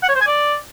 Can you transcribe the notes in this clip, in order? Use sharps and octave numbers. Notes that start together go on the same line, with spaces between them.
F#5
C#5
C5
G#5
D5